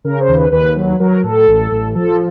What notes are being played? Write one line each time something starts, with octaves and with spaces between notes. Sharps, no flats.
C#3 A#4
C5
D#2
B4
D#2 B4
F#3
F#3 A#4
A2 A4
A1
A1
F3 A4